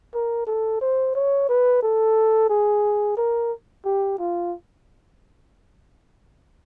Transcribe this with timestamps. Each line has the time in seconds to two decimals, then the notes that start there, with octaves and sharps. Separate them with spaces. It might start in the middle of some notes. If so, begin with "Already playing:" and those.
0.14 A#4
0.47 A4
0.81 C5
1.15 C#5
1.49 B4
1.82 A4
2.49 G#4
3.17 A#4
3.85 G4
4.18 F4